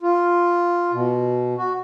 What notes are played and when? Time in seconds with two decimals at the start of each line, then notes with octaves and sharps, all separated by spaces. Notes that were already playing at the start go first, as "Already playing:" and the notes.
0.03 F4
0.92 B2
1.58 F#4